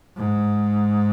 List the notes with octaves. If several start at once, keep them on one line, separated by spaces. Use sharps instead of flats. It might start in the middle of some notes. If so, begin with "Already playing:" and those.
G#2